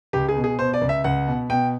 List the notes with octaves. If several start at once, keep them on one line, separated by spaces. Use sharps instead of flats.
C#2 G4
G#4
B2
G#4
B2 C5
D5
C#2
E5
C#2 F#5
B2
B2 G5